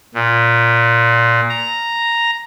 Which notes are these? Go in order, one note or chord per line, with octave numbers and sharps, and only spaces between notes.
A#2
A#5